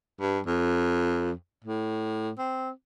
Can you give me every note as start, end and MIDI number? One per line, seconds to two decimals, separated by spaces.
0.20 0.40 43
0.46 1.32 41
1.64 2.31 45
2.38 2.70 60